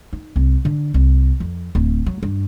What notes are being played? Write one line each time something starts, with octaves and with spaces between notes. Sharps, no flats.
D#4
C2
D3
C2
F2
D1
F#3
G2